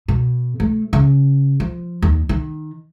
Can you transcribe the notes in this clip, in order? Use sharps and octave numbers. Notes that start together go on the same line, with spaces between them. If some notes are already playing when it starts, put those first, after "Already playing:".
B2
A3
C#3
F3
D#2
D#3